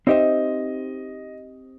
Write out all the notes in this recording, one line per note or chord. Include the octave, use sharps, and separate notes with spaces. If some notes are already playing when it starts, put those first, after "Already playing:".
C4 D#4 G4 C5 D#5 E5